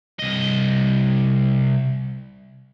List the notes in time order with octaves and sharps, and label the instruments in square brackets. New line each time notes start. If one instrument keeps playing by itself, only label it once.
[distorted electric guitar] C2 D#5